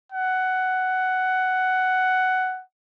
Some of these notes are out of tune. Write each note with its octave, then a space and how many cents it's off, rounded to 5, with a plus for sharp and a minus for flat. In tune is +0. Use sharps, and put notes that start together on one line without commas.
F#5 +10